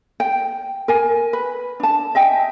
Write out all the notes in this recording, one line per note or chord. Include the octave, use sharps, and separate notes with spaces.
G5
A#4 G#5
B4
D4 A5
D#5 E5 G5 G#5